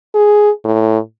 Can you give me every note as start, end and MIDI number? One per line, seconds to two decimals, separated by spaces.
0.14 0.50 68
0.64 0.98 45